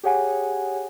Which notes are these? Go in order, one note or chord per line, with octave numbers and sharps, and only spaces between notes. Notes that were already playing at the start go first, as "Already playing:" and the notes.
G4 G#4 C#5 F#5 G#5